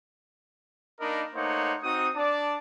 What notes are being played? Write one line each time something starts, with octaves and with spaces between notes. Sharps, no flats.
A#3 D4 D#4 A#4 D#5 B5
A3 A#3 D#4 C5 C#5 F#5
C4 D#4 F#4 D#6
D4 D5 A5